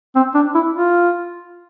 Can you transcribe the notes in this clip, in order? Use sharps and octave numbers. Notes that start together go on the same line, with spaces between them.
C4
D4
E4
F4